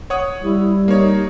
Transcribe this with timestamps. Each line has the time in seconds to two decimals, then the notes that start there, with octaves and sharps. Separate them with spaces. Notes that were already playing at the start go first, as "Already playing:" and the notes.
0.10 C#5 F#5 D#6
0.43 G3 E4
0.88 A#3 D#4 C#5